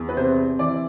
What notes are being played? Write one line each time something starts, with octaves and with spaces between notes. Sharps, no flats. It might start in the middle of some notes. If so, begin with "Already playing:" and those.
Already playing: E2
B4
C3 C5
E3 D5